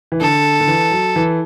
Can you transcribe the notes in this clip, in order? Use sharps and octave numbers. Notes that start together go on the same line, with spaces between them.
E3
D3 A4
D3
E3
F#3
E3